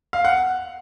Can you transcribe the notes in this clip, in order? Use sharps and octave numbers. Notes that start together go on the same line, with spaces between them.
F5
F#5